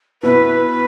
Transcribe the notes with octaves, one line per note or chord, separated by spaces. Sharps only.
B2 B3 E4 B4